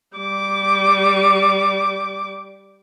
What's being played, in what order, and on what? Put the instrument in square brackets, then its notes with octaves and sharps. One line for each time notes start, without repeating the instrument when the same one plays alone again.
[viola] G3 D6